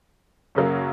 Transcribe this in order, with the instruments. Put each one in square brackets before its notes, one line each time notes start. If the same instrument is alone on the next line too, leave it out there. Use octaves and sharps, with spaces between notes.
[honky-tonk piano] F#2 C#3 F#3 A#3